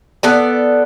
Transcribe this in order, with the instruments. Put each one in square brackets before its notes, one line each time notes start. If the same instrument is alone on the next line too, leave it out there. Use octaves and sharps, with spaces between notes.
[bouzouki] B3 A4 D5